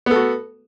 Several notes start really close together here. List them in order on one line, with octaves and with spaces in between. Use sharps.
B3 A4 F#4